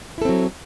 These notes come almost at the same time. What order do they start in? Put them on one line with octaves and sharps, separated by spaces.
E4 A4 C4 F#3